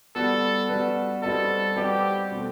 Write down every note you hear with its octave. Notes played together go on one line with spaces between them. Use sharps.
G3 B3 F#4 A4 B4
G3 B3 F#4 B4
G3 C4 F#4 A4 B4 D#5
G3 C4 F#4 G4 B4 D#5
B2 A3 C4